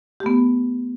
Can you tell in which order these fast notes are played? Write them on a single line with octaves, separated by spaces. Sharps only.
G4 A3 B3